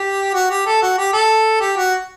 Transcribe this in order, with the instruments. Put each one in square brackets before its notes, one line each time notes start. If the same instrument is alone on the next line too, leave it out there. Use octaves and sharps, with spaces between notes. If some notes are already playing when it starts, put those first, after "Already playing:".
Already playing: [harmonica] G4
F#4
G4
A4
F#4
G4
A4
G4
F#4